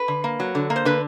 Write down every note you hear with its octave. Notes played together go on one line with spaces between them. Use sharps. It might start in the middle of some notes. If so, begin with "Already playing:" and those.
Already playing: B4
D3
A#3
F#3
D3
A#3
C5
D3 B4